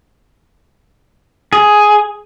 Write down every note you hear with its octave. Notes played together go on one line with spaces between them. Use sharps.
G#4